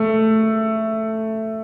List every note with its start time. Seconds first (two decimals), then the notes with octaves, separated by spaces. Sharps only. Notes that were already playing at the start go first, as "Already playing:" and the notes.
Already playing: A3